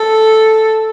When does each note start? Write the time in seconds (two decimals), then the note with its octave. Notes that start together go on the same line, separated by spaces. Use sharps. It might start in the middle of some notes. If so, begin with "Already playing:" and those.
Already playing: A4